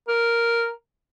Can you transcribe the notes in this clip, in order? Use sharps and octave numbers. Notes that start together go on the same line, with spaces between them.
A#4